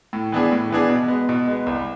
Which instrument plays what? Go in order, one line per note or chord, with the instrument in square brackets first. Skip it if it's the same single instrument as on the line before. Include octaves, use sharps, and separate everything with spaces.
[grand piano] A2
E3 B3 D4 G#4
A2
E3 B3 D4 G#4
B2
G#3 B3
B2
G#3 B3
C2